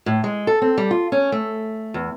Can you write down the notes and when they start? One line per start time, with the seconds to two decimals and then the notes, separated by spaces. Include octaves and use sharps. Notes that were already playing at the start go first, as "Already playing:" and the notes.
0.06 A2
0.24 G#3
0.47 A4
0.62 C4
0.77 G3
0.91 F4
1.12 C#4
1.32 A3
1.94 E2